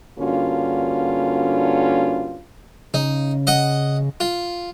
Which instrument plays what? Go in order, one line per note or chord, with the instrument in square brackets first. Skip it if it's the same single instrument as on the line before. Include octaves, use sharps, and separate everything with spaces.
[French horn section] G2 D3 A#3 C#4 F4 F#4
[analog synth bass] C#3 [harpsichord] D#4
[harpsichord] D#5 F#5
F4